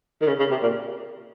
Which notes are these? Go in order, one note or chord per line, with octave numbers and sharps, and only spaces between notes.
D#3
C#3
C#3
C3
A#2